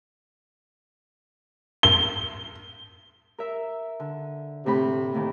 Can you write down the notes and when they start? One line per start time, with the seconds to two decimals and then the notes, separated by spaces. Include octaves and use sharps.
1.83 G7
3.39 A#4 E5
4.00 D3
4.66 A2 C3 B5
5.15 D#2 A2 D#3